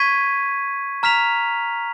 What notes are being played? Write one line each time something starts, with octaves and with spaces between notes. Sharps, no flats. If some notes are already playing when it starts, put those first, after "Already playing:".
Already playing: C#6 G#6 B6 D#7
A#5 F6 B6 F7